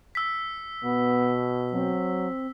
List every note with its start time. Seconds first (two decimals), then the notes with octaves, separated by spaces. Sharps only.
0.15 E6 B6
0.84 B2 B3
1.73 F#3 C4